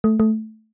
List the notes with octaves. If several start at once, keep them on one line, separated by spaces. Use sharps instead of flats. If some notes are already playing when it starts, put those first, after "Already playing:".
A3
A3